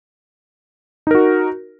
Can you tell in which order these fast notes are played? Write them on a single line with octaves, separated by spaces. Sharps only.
D#4 A#4 F#4